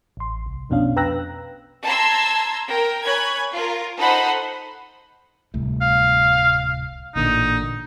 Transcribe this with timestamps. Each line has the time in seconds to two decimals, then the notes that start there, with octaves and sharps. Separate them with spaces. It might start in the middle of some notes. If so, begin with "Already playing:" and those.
0.17 A1 C6
0.46 C2
0.69 B1 F2 B2 C#4 D4 F5
0.96 B4 G5 A#5 E6 F#6 A#6
1.84 A5 A#5 C6 E6 G#6
2.70 A#4 G5
3.04 C#5 G#5 B5 F#6 G#6
3.52 F4 A#4
3.99 D#4 A4 C5 F#5 B5 C6
5.54 D1 C2 A3
5.81 F5
7.16 A1 A#2 D3 D#4